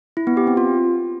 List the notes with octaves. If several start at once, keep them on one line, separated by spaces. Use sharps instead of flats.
E4
B3
G4
C4
F4